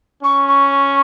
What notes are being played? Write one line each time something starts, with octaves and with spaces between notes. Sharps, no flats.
C#4 C#6
C#6